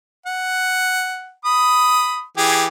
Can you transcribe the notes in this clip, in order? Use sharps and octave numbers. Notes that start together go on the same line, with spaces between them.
F#5
B5 D#6
E3 G4 G#4